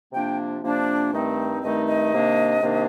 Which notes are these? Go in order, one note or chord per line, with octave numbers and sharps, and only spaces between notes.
C3 F3 A#3 D4 G5
C3 F3 A#3 D4
G2 D#3 A3 C4 D#4
G2 D#3 A3 C4 D#4 D#5
D#5
C3 D#3 A#3 D4
C3 D#3 A#3 D4